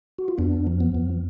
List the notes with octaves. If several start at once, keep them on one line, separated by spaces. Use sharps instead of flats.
F#4
F4
F2 B3 D4
F3
B3
F2